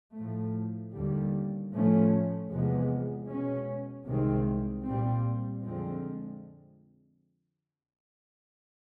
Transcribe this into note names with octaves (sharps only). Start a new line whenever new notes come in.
A2 F3 A3
D#2 D3 G3
A2 F3 A3 C#4
E2 C3 F3 G#3 B3
B2 G#3 C#4
C2 C3 D#3 G#3 C4
A#2 G3 C4
F2 D3 F3 G#3 C4